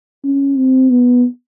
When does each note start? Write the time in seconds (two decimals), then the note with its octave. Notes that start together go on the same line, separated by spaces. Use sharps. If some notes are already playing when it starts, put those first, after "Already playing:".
0.24 C#4
0.57 C4
0.90 B3